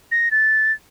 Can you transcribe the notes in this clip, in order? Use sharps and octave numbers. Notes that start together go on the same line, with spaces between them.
A#6
A6